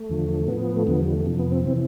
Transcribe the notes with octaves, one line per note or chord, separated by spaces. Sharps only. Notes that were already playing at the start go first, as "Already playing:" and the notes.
Already playing: A3
E2 D3 F3
A2 F3 B3
A3
E2 D3 F3 B3
G3
A3
F2 C3 F3
B3
C4
C3 E3 C4